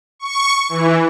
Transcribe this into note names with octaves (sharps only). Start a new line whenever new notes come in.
C#6
E3